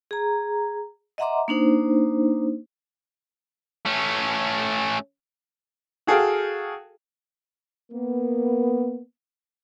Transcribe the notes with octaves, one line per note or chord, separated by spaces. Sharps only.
G#4 A#5
D#5 E5 F#5 A#5 C6 D6
A#3 D4 D#4 C5
A3 C#4
F#4 G#4 A4 F5 G5
A#3 B3